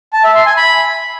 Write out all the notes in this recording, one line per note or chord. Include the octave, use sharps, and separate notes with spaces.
A5
E5
C6
G#5
B5